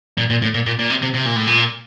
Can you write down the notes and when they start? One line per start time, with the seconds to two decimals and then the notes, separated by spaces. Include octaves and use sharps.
0.18 A#2
0.30 A#2
0.42 A2
0.54 A#2
0.66 A#2
0.79 A#2
0.90 C3
1.02 C3
1.14 C3
1.25 A#2
1.35 A2
1.47 A#2